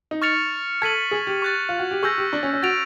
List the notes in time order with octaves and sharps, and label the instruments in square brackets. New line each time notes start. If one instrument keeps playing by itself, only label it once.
[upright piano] D#4
[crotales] C#6 F6 A6 C#7 F7
[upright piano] A4 [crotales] G#6 B6 D#7 F#7
[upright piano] G#4
G4
[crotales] C#6 F#6 A6
[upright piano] F4
F#4
G4
[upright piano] G#4 [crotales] C#6 E6 G6 A#6
[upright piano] G4
D4
C#4
C#4
[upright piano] F#4 [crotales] A6 D7 F7